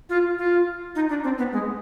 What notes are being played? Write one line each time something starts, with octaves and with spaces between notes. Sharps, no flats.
F4
F4
D#4
D4
C4
B3
G#3